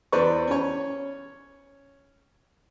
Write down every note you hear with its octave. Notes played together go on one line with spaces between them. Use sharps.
E2 B4 C5 D5 C#6
C#4 C#5